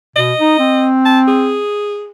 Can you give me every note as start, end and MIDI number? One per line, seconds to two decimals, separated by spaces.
0.16 0.33 47
0.16 0.87 75
0.40 0.55 63
0.59 1.62 60
1.05 1.20 81
1.27 2.11 68